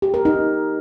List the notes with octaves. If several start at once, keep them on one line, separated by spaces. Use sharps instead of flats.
G4
A#4
D#4